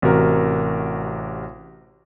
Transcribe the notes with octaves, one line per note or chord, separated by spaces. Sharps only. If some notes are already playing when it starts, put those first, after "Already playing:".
A1 C3 F#4 A#4